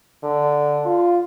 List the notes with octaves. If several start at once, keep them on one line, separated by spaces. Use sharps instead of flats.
D3
F4